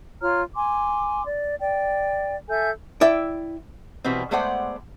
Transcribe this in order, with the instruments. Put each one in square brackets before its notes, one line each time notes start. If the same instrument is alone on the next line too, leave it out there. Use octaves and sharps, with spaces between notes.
[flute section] F4 C#5 A#5 F6
G#5 C6 D6
D5
D5 G5
A4 E5 G#5 G6
[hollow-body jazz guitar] E4 D5 E5 G5
[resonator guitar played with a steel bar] B2 E3 G3 B3 C4
G#3 A3 B3 C5 D5 F#5